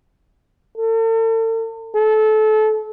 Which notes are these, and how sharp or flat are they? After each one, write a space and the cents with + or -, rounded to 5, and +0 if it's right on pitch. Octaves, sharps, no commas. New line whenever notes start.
A4 +40
A4 -25